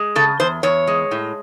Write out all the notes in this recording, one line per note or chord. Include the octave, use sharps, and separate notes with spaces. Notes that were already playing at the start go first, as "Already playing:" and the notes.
Already playing: G#3
C#3 A4
E2 C5
E2 C#5
G#3
A2